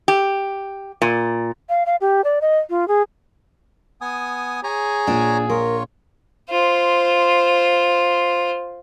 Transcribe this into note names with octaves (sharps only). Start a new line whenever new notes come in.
G4
A#2
F5
F5
G4
D5
D#5
F4
G#4
B3 G#5 D#6
G#4 C#5 G#5 A#5
A#1 D4
F4 A#4 C#5
F4 C5